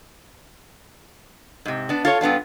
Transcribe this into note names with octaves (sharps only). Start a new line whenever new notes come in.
G#2 C3
B3 D4
F4 A4 C#5
G2 B3 D4 F4